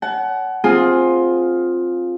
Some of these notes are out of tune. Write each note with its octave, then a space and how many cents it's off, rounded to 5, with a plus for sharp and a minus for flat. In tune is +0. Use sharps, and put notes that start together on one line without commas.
F#5 +20 A5 -40
C4 +10 F4 +10 G#4 +0